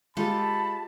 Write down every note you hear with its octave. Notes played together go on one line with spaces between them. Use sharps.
G#3 F4 G4 A4 A5 B5